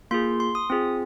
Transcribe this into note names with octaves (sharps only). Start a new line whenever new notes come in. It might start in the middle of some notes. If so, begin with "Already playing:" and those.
A#3 F4 G#4 C6
C6
D#6
C4 F4 G#4